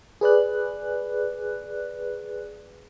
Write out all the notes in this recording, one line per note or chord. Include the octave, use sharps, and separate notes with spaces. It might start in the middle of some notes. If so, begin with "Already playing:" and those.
G#4 B4 D5 F#6